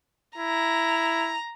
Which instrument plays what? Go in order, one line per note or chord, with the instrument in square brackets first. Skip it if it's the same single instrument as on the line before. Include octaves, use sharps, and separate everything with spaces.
[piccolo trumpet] E4 [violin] A#5